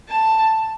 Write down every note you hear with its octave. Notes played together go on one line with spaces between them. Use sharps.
A5